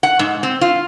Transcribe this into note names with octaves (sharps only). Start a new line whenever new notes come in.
F#5
G#2
C4
F4